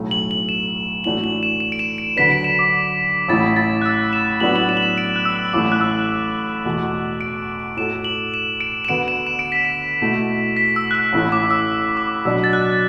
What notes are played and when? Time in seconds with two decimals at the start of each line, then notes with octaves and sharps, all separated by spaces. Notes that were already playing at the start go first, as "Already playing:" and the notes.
Already playing: B1 A2 A3
0.11 F#7
0.31 F#7
0.49 E7
1.04 A2 E3 A3 D4 F#4 F#7
1.24 F#7
1.43 E7
1.60 E7
1.72 D7
1.79 E7
1.98 D7
2.16 D2 D3 F#3 D4 B4 B6
2.32 D7
2.44 E7
2.59 D6
3.28 A1 A2 A3 E4 A6
3.56 A6
3.82 F#6
3.86 E6
4.13 E7
4.40 A2 F#3 B3 D4 F#4 F#7
4.56 F#7
4.69 E7
4.77 F#7
4.82 E7
4.98 D7
5.16 F#6
5.25 E6
5.53 A1 A2 E3 A3 D6
5.72 F#6
5.81 E6
6.65 E2 B2 A3
7.21 D7
7.77 A2 A3 F#4 A4 E7
8.04 F#7
8.34 E7
8.61 D7
8.85 E7
8.89 D2 D3 B3 F#4 B4 D7
9.08 E7
9.27 E7
9.39 D7
9.52 B6
9.65 D7
10.02 B2 A3 E4
10.57 B6
10.76 E6
10.91 F#6
10.95 E6
11.13 A1 A2 A3 E4
11.32 D6
11.51 E6
11.97 D6
12.25 B2 F#3 D4 E6
12.44 A6
12.53 F#6